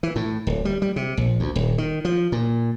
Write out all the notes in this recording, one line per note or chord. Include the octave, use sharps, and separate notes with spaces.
E3
A2
D1
G3
G3
C3
A#1
D2
D#1
D#3
F3
A#2